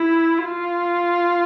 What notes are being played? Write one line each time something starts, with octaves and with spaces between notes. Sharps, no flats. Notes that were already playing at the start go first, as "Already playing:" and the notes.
Already playing: E4
F4